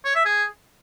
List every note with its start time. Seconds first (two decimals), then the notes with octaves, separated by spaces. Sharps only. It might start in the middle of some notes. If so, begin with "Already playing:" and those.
0.05 C#5
0.15 E5
0.25 G#4